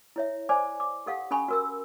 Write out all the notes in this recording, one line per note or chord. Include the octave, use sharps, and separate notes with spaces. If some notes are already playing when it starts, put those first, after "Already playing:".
E4 C#5 E5
C5 D5 G#5 D6
D6
G4 A4 F5 F#5
C#4 A4 G#5 B5 C#6
F#4 A#4 E6